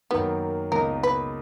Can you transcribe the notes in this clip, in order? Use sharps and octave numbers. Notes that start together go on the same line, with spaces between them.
F#2 D#3 A#3 B3
C#2 B2 A#3 D#4 A#4
B4